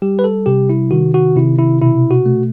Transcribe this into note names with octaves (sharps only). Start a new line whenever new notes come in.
G3 G4
B4
A4
C3 G4
E4
D#3 F#4
F#4
C3 E4
E4
B2 E4
F#4
A3